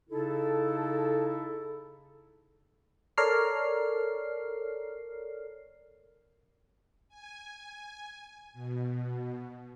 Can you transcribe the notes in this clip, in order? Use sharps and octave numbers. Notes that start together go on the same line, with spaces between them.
C#3 D#4 E4 A4
A4 A#4 C#5 D5 F6 C7
G#5
B2